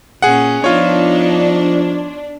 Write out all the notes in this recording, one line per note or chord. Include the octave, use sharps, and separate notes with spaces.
A#2 C#4 G#4 F#5
F3 B3 D4 D#4 F4 C#5